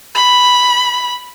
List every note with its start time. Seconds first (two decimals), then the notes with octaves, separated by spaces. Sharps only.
0.15 B5